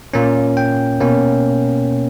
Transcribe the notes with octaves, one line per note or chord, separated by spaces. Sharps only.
A#2 A#3 C#4
G5
B2 A#3 C#4